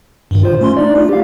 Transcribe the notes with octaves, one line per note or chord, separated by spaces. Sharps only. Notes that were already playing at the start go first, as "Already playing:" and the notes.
G2 A#2 D#3
F4 C5
A3 C#4 C6
D4 D#4 D5
A3 F4
G4 F5